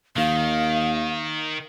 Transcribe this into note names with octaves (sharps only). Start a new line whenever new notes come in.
D#2 D#3 F5